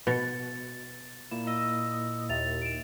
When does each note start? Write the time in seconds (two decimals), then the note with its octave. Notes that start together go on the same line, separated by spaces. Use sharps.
0.07 B2 A6 C#7
1.31 A#2 A#3 E4 E7
1.47 D#5 E6
2.29 D#2 E5 A6 F7
2.62 D7 E7